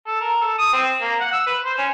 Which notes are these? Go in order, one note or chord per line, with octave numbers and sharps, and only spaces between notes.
A4
A#4
A4
D#6
C4
A#3
F#5
E6
B4
C5
C#4